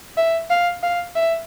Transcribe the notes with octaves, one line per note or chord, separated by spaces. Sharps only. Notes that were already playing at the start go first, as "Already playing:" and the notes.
E5
F5
F5
E5